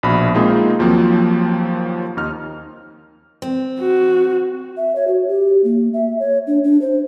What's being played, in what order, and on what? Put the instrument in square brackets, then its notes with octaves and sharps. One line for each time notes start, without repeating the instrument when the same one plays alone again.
[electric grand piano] A#1 B2 B5
G#3 A#3 C4 D#4 F4 G#4
D#2 F3 F#3 A#3 C4
D#2 D#4 F6
[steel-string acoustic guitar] C4
[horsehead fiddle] F#4
[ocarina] E5
C#5
F#4
G4
A#3
E5
C#5
D4
D4
C5